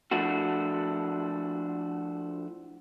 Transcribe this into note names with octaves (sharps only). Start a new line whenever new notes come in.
F3 A3 D4 E4 F#4